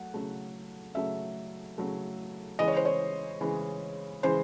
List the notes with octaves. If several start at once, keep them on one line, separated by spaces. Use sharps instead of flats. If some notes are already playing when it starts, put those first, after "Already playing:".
Already playing: F#3 A3 F#5
C#3 F#3 A3
C#3 F#3 A3 E5
C#3 F#3 A3
C#3 E3 G#3 D#5
C#5
C5
C#5
C#3 E3 G#3
C#3 E3 G#3 C5